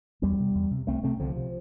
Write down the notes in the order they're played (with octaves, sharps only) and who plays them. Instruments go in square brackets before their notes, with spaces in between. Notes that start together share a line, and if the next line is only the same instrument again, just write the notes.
[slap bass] E2 G3 B3
C3
E2
C3
C2 A3 C4
C3 A3 C4
C2 D3 F3
C3